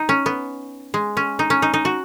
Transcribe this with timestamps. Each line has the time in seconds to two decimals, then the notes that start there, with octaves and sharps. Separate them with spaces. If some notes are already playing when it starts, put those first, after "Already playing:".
Already playing: D#4
0.09 C#4
0.26 B3
0.94 G#3
1.17 C#4
1.39 D#4
1.50 C#4
1.62 D#4
1.74 D#4
1.85 F#4